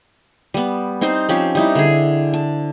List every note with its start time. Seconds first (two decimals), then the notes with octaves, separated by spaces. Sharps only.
0.54 G3 B3
1.01 C4 D#4 C5 C6
1.29 F3 C4 C#4 G4
1.55 G3 D#4 E4
1.75 D3 G#4
2.34 A5